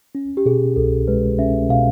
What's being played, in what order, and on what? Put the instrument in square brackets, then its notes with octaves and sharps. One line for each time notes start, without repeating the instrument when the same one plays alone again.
[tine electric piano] C#4
[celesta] G4
[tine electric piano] B2 [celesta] G#4
[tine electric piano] C2 [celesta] A4
[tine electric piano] G#3 [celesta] B4
[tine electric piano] C#4 [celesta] E5
[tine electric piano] B2 [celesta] F5